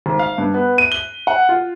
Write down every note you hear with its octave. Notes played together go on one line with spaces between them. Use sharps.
G#1
F5
G2
B3
D#7
G7
F#5
F4